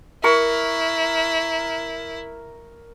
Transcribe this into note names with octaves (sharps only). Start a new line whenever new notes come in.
E4 A#4 C#6